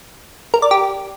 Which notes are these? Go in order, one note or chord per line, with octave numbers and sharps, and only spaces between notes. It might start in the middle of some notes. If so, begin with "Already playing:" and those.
A#4
D5
G4